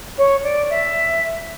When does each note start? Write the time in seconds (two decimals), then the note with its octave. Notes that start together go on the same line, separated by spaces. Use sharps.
0.18 C#5
0.43 D5
0.70 E5